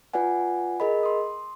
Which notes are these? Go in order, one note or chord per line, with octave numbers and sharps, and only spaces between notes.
F4 B4 D5 F#5 G#5
G#4 A#4 D#5 B5
C6 D#6